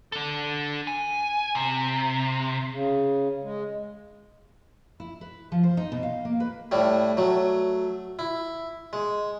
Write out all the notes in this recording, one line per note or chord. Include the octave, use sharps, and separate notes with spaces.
D4 A4
G#5
C3
C#3
G#3
E4
B4
F3
C5
D#4
B2
F5
A#3
B4
A2 G3 A3
F#3 A3
E4
G#3